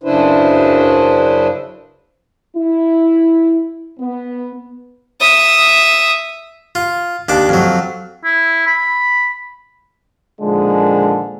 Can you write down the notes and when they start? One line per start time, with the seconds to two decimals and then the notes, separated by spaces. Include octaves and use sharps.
0.03 F#2 C#3 D4 E4 B4 C5
2.56 E4
4.00 B3
5.20 E5 D#6
6.75 F4
7.29 D#2 D4 D6
7.49 F2 F#3
8.25 E4
8.67 B5
10.41 A#2 D3 D#3 F3 G#3